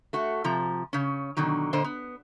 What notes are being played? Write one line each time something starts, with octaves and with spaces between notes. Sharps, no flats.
A3 F#4 F#5
C3 F3 A#5
C#3 C#4
B2 D3 D#3 F#3
A#2 D3 C5 D#5
B3